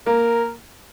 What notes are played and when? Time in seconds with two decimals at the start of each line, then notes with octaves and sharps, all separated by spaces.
0.06 A#3 A#4